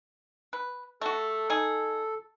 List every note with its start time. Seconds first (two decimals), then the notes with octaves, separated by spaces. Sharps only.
0.53 B4
1.01 A3 F#4 A4
1.50 D#4 G#4